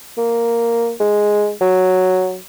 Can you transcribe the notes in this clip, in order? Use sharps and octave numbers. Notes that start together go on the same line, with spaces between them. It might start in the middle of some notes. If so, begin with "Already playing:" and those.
A#3
G#3
F#3